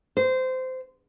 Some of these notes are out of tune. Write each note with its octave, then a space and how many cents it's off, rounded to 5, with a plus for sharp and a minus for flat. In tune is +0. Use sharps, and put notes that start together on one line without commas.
C5 -20